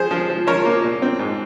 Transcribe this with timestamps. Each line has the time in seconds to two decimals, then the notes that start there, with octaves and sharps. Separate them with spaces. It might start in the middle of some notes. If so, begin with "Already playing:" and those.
Already playing: F3 G#4 C5
0.11 F3
0.30 F3
0.47 F3 A#4 C#5
0.65 A#3
0.84 A#2
1.02 C4
1.19 G#2